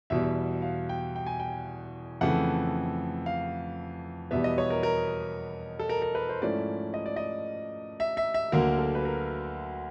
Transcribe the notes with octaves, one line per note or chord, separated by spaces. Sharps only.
E2 B2 G3 E5
F5
G5
G5
G#5
G5
F2 C#3 E3 A3 F#5
F5
E2 B2 G3 B3 E5
D#5
C#5
A#4
A#4
A4
A#4
A#4
B4
C5
G#2 F3 A3 C#4 E4 D5
D#5
D5
D#5
E5
E5
E5
D2 D3 F#3 A#3 A#4
A4
B4
A#4